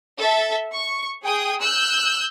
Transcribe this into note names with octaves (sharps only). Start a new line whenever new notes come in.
A4 E5
C#6
G#4 G5 D#6
E6 F#6 G6